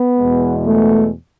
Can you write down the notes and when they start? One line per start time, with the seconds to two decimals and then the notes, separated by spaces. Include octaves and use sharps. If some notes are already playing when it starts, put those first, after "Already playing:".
Already playing: B3
0.18 E2 B2 G#3
0.66 A3